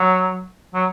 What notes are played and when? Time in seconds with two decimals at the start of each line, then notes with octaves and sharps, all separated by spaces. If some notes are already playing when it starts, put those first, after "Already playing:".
Already playing: F#3
0.74 F#3